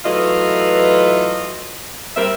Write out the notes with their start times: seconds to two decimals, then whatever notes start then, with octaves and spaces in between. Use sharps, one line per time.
0.05 E3 F#3 A3 F4 B4 D#5
2.17 G3 A#3 C4 A#4 E5